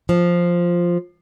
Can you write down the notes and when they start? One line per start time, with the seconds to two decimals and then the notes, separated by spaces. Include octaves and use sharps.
0.09 F3